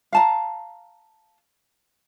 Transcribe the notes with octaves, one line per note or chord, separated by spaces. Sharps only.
F5 A5 A#5